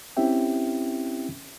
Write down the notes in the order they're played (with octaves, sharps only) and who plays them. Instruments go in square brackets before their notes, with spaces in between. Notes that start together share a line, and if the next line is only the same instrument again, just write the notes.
[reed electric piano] C4 C#4 E4 G4 E5 G5